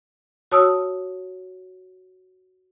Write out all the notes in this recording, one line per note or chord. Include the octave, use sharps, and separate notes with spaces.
F#4 C#5 A5 D#6 E6